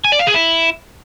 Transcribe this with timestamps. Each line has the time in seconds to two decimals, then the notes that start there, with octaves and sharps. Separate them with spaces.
0.05 G#5
0.12 D5
0.19 F5
0.27 G#4
0.34 E4